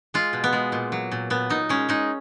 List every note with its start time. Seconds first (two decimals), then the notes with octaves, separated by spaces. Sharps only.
0.14 G#3 F4
0.33 B2
0.44 B3
0.53 G#3
0.72 A#2
0.92 F#3
1.11 A#2
1.30 A#2 B3
1.50 A#2 D#4
1.69 G#3 C#4
1.89 G#3 D#4